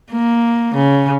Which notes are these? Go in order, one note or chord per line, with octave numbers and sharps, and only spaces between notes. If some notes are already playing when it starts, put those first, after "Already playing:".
A#3
C#3